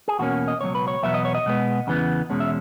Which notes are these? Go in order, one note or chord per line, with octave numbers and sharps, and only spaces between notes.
G#4
E2 B2 A#3 C#4 F#4
D#5
C#2 B2 F#3 C#5
B4
C#5
E2 B2 F#3 B3 E5
D#5
C#5
D#5
B2 G#3 B3
E2 C#3 E3 B3
E2 B2 G#3 C#4
E5